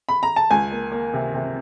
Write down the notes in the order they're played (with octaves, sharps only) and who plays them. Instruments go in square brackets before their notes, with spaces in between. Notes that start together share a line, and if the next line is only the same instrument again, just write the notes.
[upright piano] B5
A#5
A5
C#2 G#5
A#3
A#3
C3
C3